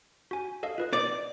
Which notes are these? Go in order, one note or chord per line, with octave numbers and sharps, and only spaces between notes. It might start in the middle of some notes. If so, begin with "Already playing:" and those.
F#4 G#5
A4 D#5 F5
F4 B4 D#5
D5